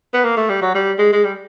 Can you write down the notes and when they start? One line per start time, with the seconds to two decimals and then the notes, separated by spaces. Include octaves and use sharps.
0.14 B3
0.24 A#3
0.37 A3
0.49 G3
0.62 F#3
0.75 G3
0.99 G#3
1.13 G#3
1.24 G3